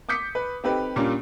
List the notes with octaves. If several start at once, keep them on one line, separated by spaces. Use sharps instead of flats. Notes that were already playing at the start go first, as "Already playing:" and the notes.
D6 D#6 G6 B6 C#7
B4
C4 D#4 G4 A4 B4
A#2 G3 A#3 C#4 D4